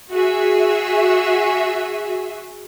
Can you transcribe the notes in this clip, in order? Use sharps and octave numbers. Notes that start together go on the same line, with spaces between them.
F#4 G#4 E5